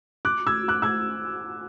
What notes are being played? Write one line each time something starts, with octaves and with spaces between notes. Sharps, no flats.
D6 F#6
E6 G#6
D6 F#6
E6 G#6